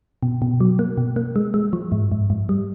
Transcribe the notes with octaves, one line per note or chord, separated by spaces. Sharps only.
B2
B2
F#3
A#3
B2
A#3
G#3
G#3
F3
G#2
G#2
G#2
G3